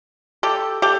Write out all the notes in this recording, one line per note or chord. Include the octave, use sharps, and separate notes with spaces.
G4 A4
G4 A4